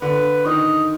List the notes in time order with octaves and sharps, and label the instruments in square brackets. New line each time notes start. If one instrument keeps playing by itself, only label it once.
[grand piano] D3 [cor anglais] B4
[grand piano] D#3 [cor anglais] D#5